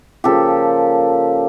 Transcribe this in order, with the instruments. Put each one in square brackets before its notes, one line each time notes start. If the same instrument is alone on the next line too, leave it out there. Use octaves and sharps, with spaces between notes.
[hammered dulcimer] C#3 F3 A#3 G4 A4